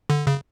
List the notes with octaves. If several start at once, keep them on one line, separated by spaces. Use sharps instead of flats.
D3
C#3